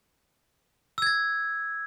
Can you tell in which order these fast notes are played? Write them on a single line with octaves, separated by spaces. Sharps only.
E6 G#6 A6